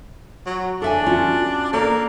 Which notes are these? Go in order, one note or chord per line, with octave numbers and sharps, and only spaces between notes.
F#3
D4 A4 E5 G#5
C#4 F4 F#4
A#3 A4 A#4 D5